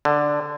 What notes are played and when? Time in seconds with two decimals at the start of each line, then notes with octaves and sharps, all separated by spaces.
0.05 D3